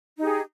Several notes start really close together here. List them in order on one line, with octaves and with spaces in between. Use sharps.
D#4 G4 G#4